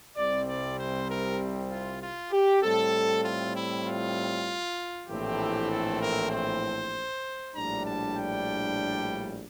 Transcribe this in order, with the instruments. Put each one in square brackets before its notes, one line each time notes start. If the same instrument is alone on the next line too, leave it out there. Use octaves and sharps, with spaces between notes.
[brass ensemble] C2 C3 G3 C4 D5
D5
C5
A#4
F4
F4
G4
A2 G3 C4 A4
F4
E4
F4
A#1 A2 E3 A3 C4 G4
A4
A#4
C5
A#1 A2 G3 D4 A#5
A5
G5